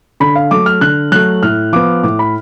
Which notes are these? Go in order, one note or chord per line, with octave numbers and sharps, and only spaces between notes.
D3 B5
F5
F#3 A3 D6
F6
D3 F#6
F#3 A3 F#6
A2 F6
F3 B3 D6
A2 D6
B5